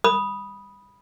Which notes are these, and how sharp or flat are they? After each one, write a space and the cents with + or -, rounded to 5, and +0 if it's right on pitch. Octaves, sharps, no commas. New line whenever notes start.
B5 -10 D#6 +0